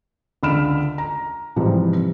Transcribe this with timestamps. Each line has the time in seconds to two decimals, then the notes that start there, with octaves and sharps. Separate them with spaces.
0.43 C#2 D3 B5 F6 D7 E7
0.98 A#5
1.56 G#2 C3 E3 F3 G3